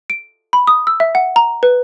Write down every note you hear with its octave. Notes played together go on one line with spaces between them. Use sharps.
D7
B5
D#6
E6
E5
F#5
A#5
B4